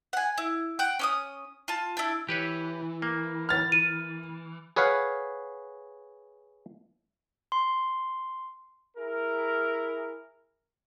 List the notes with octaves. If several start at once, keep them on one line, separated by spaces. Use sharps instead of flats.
F#5 G#5
E4
F#5 G5
C#4 D6 D#6
F4 A5
D4 E4
E3 G4 B4 C#5
A#3
F6 A6
D#7
G#4 B4 C#5 F5 F#5
C6
E4 G#4 A#4